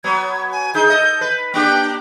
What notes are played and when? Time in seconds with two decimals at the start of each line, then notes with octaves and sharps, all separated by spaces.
0.04 F#3 B3 G#6
0.52 G#5
0.74 D#4 G#4 G6
0.89 A4 D#5
1.21 B4
1.54 A#3 D4 G4 G5